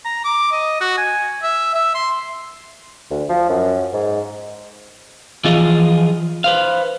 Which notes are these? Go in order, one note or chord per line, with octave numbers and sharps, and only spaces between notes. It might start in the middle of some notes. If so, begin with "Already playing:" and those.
A#5
D6
D#5
F#4
G#5
E5
E5
C6
D2
F3
F#2
G#2
E3 F3 F4 G#4 D#5 F5
B4 C5 F5